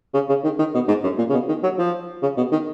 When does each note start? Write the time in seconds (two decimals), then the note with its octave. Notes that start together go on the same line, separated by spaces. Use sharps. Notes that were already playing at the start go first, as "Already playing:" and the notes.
0.14 C#3
0.29 C#3
0.44 D#3
0.59 D#3
0.75 B2
0.88 G#2
1.04 F#2
1.18 A#2
1.30 C#3
1.33 B2
1.49 D#3
1.63 F#3
1.78 F3
2.22 C#3
2.37 B2
2.52 D#3